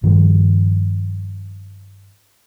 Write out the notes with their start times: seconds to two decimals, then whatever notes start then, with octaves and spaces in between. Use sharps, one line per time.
0.03 G2 D#3 F3 G3